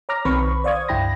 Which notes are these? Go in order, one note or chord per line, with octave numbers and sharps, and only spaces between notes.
C#5 A#5 D6 F6 A#6
B1 D#3 C4 B4 B5 C#6
C5 D5 F5 C#6 D#6 G#6
C#2 G2 E4 G5 B5 A#6